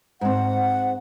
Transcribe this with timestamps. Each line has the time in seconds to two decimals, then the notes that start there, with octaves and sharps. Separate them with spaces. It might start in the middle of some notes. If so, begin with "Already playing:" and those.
0.21 G#2 C4 F#5